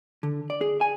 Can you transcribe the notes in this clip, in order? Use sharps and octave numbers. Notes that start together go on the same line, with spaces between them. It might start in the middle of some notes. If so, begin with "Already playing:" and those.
D3
D5
G#4
G#5